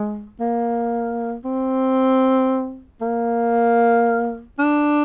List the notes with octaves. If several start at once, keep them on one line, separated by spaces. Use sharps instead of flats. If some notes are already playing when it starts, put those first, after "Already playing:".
Already playing: G#3
A#3
C4
A#3
D4